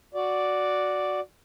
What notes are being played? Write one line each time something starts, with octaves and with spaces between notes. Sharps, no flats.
F#4 D5